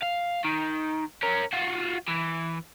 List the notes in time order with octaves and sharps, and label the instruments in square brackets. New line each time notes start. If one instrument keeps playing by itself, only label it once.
[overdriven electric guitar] F5
D#3
C#4 A#4
F4 F#4
E3